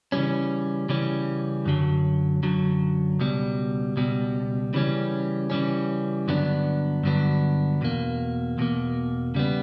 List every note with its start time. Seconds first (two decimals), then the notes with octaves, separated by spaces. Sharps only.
0.12 C#3 E3 G3 C#4
0.89 C#3 E3 G3 C#4
1.65 F#2 D3 F#3
2.43 F#2 D3 F#3
3.19 C#2 B2 G3
3.96 C#2 B2 G3
4.74 C#3 E3 G3 C#4
5.50 C#3 E3 G3 C#4
6.28 G2 D3 F#3 B3 D4
7.03 G2 D3 F#3 B3 D4
7.81 E2 B2 A#3
8.58 E2 B2 A#3
9.35 C#3 G3 B3